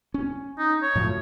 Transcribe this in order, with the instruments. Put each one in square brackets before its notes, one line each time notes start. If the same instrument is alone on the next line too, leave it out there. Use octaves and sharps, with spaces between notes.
[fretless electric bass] C#4
[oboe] D#4
C#5
[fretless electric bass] A2 F3 F#3